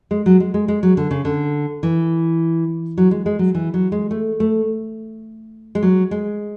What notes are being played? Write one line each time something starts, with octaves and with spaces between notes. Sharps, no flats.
G#3
F#3
G#3
G#3
G#3
F#3
D3
C#3
D3
E3
F#3
G#3
G#3
F#3
E3
F#3
G#3
A3
A3
G#3
F#3
G#3